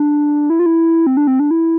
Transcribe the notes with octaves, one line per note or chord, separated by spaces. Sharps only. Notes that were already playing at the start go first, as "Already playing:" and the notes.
Already playing: D4
E4
F4
E4
C4
D4
C4
D4
E4